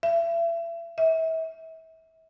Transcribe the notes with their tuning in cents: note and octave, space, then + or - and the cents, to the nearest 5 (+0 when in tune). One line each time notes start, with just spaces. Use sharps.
E5 +35
E5 -35